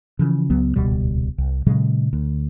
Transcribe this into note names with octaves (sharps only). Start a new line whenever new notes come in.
C#3 E3 F3
C#2 F#3 B3
D#1 C#2 B2 G3
C2
A#2 C#3 F#3 G#3
D2